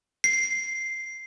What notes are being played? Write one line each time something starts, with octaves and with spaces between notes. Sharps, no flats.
C7